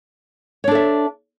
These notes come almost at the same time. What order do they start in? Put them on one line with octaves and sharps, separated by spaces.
C#5 D4 A4 E5